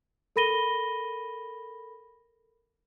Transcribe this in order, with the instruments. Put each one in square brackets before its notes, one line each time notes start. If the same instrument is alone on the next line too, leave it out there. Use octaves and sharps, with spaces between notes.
[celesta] A4 A#4 B5 A#6 D#7 G7